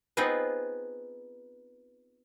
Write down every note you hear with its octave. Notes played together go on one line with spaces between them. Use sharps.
B3 C4 D#4 F4 G#4 B4